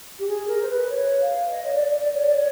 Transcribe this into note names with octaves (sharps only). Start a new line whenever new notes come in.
G4
G#4
A#4
C5
B4
C#5
F5
D#5
C#5
D5
D5
C#5
D5
C#5